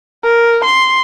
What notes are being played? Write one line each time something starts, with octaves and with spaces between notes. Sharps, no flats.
A#4
C6